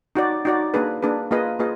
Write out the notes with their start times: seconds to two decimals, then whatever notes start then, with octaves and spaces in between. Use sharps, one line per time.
0.15 D#4 F#4 D5
0.45 D#4 F#4 D5
0.74 A#3 D4 G#4 B4
1.03 A#3 D4 G#4 B4
1.31 A#3 F4 G#4 B4 D#5
1.59 A#3 F4 G#4 B4 D#5